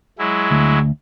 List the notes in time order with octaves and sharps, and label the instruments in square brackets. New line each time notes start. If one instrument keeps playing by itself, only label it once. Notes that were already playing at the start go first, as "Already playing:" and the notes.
[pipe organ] F#3 G#3 E4
[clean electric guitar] D2